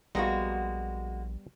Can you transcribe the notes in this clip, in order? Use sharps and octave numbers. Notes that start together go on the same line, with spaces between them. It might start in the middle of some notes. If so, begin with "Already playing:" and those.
A#1 G3 G#3 A#3 B3 F#4 A#5